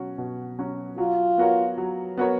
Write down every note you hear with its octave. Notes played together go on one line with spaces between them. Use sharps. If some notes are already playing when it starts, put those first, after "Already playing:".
Already playing: B2 F#3 C#4 F#4
B2
F#3 C#4 F#4
F#3 F4
B3 F#4 A#4 C#5
F#3
B3 F#4 A#4 C#5